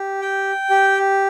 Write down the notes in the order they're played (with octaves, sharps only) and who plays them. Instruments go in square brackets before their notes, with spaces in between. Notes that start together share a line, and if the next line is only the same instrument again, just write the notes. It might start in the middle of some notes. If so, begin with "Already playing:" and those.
Already playing: [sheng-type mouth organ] G4
G5
G4